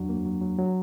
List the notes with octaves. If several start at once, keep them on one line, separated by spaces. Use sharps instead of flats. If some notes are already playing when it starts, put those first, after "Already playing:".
Already playing: E2 F#3 D4 F#4
A#3
F#3
F#3
F#3